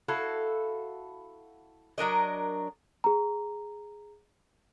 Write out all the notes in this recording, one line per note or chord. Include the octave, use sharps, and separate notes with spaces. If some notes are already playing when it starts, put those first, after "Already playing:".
E4 F#4 A4 F5
F#3 D4 A#4 D#5
G#4 A#5